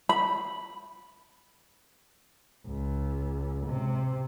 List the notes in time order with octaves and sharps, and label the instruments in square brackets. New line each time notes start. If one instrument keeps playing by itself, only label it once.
[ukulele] B5
[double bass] C#2
C3